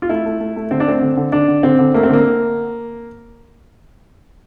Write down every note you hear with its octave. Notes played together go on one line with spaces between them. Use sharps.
F4
A3 E4
A3
A3
A3
D3 C4
D4
A3 C4
D3
D3
D3 D4
D3
D3 C4
D3
A3 A#3
C4
D3 A#3